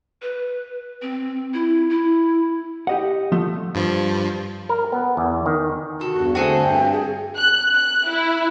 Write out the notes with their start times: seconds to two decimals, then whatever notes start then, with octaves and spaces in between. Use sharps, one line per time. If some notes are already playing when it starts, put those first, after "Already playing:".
0.22 B4
1.02 C4
1.54 E4
1.90 E4
2.87 G4 D#5 F#5
3.32 F3 A3
3.75 G2 F3
4.69 A#4
4.92 B3
5.17 E2
5.46 D#3
6.01 C3 F#4 A4
6.13 E2 G2
6.35 D3 A3 C4 F#4 G#4 A4 C5
6.61 G2 G5
6.92 G#4
7.36 F#6
7.75 F#6
8.08 E4